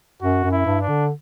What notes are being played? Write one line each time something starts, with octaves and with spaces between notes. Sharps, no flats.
F#2 F#4
F#2
E4
G2
D4
D3